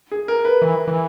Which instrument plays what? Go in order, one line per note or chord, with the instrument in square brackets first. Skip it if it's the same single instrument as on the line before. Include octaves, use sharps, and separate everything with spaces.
[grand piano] G#4
A#4
B4
[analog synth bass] E3
E3